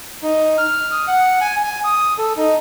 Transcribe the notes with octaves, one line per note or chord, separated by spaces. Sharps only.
D#4
F6
D#6
F#5
G#5
G#5
D#6
A4
D#4